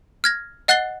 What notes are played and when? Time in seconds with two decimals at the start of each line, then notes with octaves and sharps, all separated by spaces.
0.24 F6 G#6 A#6
0.68 D#5 F#5 F#6 A6 C7 G7